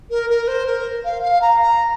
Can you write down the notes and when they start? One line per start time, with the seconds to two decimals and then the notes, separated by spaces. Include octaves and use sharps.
0.10 A#4
0.29 A#4
0.47 C5
0.66 A#4
1.04 F5
1.22 F5
1.41 A#5
1.60 A#5